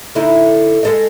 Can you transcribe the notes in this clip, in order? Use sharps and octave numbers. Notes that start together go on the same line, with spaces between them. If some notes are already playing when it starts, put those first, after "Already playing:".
D3 D#4 E4
G#3 A4 D#5